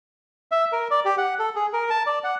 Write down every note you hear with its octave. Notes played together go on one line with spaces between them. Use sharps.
E5
A#4
D5
G4
F#5
A4
G#4
A#4
A5
D5
F#5